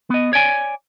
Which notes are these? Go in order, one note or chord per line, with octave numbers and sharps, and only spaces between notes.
B3 D#5
C#5 D5 G#5